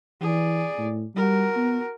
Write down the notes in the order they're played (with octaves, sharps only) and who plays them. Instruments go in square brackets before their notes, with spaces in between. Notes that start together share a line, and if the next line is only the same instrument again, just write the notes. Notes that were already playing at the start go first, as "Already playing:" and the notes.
[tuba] E3 [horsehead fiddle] G#4 D5
[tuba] A2
[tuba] G3 [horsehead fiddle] F#4 A#4
[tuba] B3